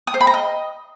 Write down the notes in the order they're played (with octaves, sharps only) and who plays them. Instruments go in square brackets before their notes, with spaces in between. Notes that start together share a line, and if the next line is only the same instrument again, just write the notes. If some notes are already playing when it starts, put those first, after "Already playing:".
[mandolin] D#6
C5
B5
A#5
D#5